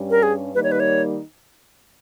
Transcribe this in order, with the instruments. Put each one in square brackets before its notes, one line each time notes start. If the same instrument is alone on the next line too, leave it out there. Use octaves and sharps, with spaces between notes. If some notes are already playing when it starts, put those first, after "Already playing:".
Already playing: [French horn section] G2 G3 C#4
[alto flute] A#4
G#4
[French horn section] D#3 G3 A#3 D#4 [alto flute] B4
[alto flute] C#5
B4
C#5